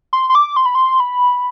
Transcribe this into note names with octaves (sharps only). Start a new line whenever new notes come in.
C6
C6
D6
C6
B5
C6
B5